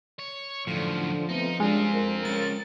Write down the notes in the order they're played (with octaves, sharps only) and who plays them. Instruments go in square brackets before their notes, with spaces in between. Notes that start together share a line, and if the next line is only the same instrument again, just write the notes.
[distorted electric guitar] C#5
[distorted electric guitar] F#2 A2 [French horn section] D3 [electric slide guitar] F3
[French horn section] A3 B3 C4 [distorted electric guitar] D#4
[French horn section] F#2 G3 D4 [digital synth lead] G#3 [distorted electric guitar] C4 F4
[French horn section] F2 A#4
[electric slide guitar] G#3 C#4 [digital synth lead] A6